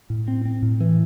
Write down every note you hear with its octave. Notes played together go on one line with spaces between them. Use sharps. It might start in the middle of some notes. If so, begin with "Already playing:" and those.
A2
C4
C4
A2
E3